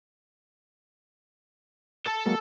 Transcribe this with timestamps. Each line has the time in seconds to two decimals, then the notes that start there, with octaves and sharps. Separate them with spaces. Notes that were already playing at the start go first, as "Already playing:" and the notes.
2.07 A4 A5
2.26 F#3 G#3 A#3